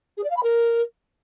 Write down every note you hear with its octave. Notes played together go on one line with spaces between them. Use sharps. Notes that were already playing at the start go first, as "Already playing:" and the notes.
G#4
D5
F5
B5
A#4